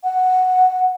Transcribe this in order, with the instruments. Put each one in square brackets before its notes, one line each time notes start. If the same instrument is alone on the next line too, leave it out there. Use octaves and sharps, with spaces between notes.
[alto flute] F#5